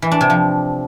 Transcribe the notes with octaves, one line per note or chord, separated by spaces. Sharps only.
E3
D4
C3
F3